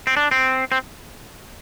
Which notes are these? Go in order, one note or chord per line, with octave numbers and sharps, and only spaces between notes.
C4
D4
C4
C4